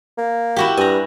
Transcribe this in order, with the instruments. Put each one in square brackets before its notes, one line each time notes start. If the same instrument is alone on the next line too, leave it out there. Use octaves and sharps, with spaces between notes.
[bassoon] A#3
[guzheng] E4 F#4 G4
[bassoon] G2 [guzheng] G#5 A#5